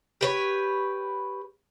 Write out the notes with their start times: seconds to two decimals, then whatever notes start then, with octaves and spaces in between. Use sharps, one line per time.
0.21 G4 B4 C#5